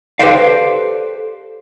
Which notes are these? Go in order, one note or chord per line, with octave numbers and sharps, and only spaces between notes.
G4 A4 B4 C5 D5 F5